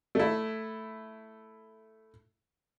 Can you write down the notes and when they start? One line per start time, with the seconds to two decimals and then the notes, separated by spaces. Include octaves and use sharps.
0.15 A3 E4